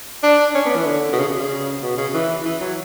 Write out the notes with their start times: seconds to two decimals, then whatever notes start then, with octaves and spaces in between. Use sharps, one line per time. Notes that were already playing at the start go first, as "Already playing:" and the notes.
0.23 D4
0.55 C#4
0.66 B3
0.76 E3
0.86 D3
1.13 B2
1.19 C#3
1.40 C#3
1.82 B2
1.97 C#3
2.14 E3
2.45 E3
2.61 F#3